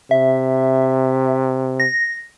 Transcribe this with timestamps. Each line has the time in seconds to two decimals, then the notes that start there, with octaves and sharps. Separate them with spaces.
0.11 C3 E5
1.80 A#6